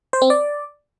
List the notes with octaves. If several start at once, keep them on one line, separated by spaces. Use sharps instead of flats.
C5
C4
D5